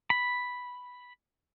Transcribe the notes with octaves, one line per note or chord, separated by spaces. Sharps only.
B5